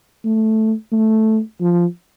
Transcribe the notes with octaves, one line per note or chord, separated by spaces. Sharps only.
A3
A3
F3